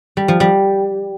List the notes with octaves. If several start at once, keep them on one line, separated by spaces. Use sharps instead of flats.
G3
F3
G3